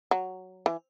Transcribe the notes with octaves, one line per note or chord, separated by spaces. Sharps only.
F#3
E3